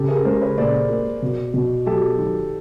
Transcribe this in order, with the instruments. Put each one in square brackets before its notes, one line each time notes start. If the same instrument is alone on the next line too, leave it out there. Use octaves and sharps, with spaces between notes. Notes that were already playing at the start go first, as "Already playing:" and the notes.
Already playing: [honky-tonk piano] C#3 [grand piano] G4 A4
[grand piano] G#4 A#4
[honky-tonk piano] G#3 [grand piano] A#4 C5
[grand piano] B4 C#5
[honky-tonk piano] A#2 [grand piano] C5 D5
[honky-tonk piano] A#3
B2
B2
[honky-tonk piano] F#3 [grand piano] G4 A4
[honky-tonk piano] D#3